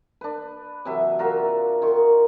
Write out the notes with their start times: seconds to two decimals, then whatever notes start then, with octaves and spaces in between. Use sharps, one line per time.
0.21 D4 B4
0.85 C3 E3 F#3 E5
1.19 F4 F#4 A#4 E5
1.82 D#3 C6 C#6